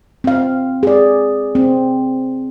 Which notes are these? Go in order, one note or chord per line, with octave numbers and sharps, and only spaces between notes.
C4 F5
G#4 D5
C4